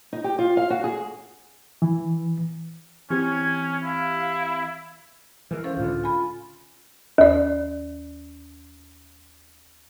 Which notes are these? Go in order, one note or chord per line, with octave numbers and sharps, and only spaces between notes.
D#4
G4
F4
F5
F#4
G#4
E3
E3 C4 C#4 G4 G#6
E4 F5
E3 G#3 A#4
C#4 A4 C5 F5
C#2 A2 D3 F4
G#5 B5
D#2 D5